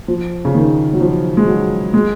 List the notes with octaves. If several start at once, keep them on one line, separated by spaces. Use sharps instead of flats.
F3
C#3
D#3
F#3
F3
G#3
F#3
G#3